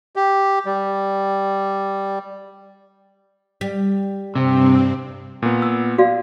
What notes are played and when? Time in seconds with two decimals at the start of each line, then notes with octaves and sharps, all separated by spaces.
0.16 G4
0.66 G3
3.61 G3
4.35 G2 C3 C4
5.42 A#2 B3
5.62 E6
5.98 F#4 D5 F5